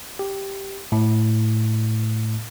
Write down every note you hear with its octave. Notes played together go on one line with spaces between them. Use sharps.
G4
A2